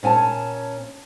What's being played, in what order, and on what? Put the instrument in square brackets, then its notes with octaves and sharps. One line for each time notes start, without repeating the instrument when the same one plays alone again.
[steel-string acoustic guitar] A#2 C#4 G#5 A5